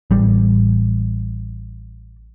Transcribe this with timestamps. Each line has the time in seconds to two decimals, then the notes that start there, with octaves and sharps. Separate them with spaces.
0.11 A1 G3